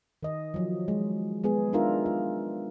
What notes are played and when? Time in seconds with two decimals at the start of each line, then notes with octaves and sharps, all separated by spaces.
0.23 D#3 D#5
0.54 F3 F#3
0.88 G#3
1.44 G#3 B3 G#4
1.73 D4 D#4 F4 A#4 E5
2.06 F4